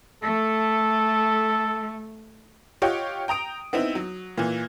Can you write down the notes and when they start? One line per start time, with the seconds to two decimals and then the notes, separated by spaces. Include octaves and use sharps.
0.23 A3 A4
2.82 F4 G4 C#5 D#5 F#5 G5
3.28 G5 A#5 D#6 D7
3.73 B3 C4 D#4 E4
3.95 F#3
4.38 A#2 E3